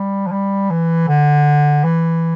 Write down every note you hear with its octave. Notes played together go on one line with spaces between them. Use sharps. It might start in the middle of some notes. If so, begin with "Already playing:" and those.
Already playing: G3
F3
G3
E3
D3
E3